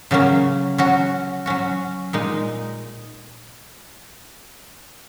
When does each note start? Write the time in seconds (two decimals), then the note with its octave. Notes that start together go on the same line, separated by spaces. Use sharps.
0.11 C#3 F#3 A#3 C#4
0.78 F#3 C#4 F#4
1.46 F#3 C#4 F#4
2.13 A#2 G#3 D#4